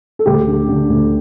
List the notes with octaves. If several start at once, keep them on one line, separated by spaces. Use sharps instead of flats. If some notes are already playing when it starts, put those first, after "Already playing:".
A4
D2 G4
D3
D3
D2